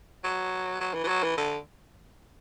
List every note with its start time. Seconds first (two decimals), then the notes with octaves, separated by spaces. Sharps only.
0.24 F#3
0.80 F#3
0.94 E3
1.04 E3
1.08 F#3
1.23 E3
1.37 D3